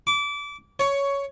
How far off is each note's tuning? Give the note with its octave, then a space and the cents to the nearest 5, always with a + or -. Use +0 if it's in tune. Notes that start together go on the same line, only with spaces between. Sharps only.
D6 -25
C#5 +10